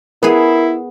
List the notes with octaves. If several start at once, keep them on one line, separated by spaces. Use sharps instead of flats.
B3 E4 G#4 A#4 B5 C7